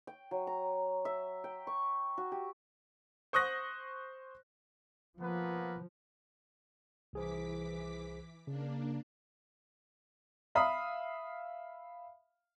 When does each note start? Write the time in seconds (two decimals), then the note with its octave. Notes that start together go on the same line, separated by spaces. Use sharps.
0.07 G5
0.31 F#3
0.47 A#5
1.05 E5
1.44 G5
1.67 C#6
2.18 F#4
2.32 G4
3.33 C5 C#6 D#6 F#6 A#6
5.20 F3 A#3 B3 B4
7.13 C2 E3 G#4 C5 D6 B6
8.47 C#3 A#3 D4
10.55 E5 F5 B5 D#6